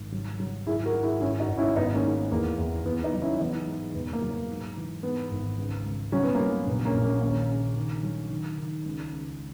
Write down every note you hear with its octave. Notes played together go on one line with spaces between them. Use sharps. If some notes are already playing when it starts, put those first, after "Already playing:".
Already playing: G#1
F#3
F#3
G#1 E4 G#4
F#4 A#4
G#2
E4 G#4
G#1 C#4 E4
D#4 F#4
G#1
C#4 E4
G#1 B3 D#4
A#3 C#4
G#2
E2 A#3
E2
E2 B3
B3 D#4
F#3
C#4 E4
E3 B3 D#4
G#2
E1 B3
A#3
F#3
A#3
G#2
E3
G#2 B3
G#1
C#2
C#2
F#3 C#4
B3
A#3 C#4
F#3
A#1 B3
A#3 C#4
A#1
A#3 C#4
D#2 A#3 C#4
C#3
D#3
F#3
D#3
D#3
C#2
C#2